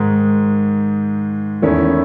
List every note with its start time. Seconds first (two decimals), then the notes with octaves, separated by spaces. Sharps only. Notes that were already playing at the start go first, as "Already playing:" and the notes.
Already playing: G#2 D#3 G#3
1.62 E2 D#3 A3 C#4 E4